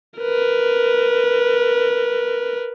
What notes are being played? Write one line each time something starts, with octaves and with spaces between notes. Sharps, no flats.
A#4 B4